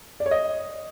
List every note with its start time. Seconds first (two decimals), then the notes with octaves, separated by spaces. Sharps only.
0.20 D5
0.26 C#5
0.31 D#5